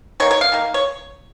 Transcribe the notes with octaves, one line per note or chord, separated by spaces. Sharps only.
D#3 A#3 C#5
C#5
F5
D#3 A#3
C#5